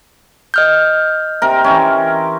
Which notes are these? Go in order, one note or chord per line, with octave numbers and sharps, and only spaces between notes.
D#5 F6 G6
C3 A#4
E3 C4 C#4